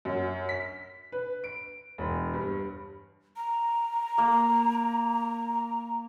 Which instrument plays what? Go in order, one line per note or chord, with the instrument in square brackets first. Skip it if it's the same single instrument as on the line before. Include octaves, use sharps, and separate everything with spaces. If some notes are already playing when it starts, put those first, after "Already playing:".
[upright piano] F#2
B6
B4
D7
E1
G2
[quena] A#5
[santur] A#3